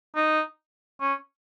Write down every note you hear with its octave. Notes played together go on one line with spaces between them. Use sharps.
D#4
C#4